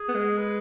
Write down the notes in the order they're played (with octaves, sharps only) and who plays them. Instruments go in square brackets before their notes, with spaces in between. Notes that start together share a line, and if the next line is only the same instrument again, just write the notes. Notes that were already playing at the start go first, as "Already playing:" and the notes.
Already playing: [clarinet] G#4
[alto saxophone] B3
G#3
[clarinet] B4